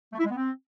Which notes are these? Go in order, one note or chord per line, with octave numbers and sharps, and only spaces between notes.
A3
E4
G#3
B3
C4